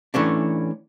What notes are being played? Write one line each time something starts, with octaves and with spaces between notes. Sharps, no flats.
E3 A3 C#4 D4